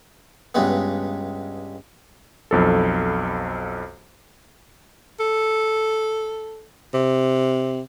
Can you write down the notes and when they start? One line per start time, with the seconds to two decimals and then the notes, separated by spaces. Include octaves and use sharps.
0.55 C#2 G2 G#3 B3
2.51 B1 F2 A4
5.20 A4
6.94 C3